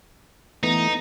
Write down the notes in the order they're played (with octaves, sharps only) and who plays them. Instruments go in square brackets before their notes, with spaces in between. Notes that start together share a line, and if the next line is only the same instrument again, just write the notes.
[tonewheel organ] E3 A3 B3 [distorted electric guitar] D#4